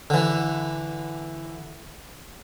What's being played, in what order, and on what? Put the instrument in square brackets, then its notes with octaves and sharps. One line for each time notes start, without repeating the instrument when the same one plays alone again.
[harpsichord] D3 E3